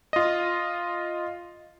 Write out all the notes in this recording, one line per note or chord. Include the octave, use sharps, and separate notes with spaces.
F4 D#5